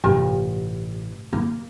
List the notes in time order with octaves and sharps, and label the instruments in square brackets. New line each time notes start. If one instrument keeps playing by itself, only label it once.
[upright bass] A1 [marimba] G2 C3 G4
[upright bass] A#3